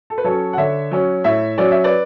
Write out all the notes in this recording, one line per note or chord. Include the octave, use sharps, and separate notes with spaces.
A4
B4
F#3 C#4 A4 C#5
F#5
D3 C#5 E5
F#3 C#4
A2 C#5 E5
F#3 C#4 D5
E5
B4 D5